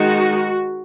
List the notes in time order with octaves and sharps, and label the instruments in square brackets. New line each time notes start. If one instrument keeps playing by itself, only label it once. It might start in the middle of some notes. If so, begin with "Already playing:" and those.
Already playing: [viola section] D#3 G#3 D#4 F#4